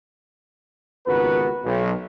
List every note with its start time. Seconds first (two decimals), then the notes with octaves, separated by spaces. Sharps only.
1.07 G#1 C#2 B3 F#4 A#4 B4
1.64 B1